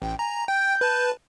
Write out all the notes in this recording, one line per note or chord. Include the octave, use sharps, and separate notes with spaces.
A1 G5
G#5 A#5
G5 G6
B4 A5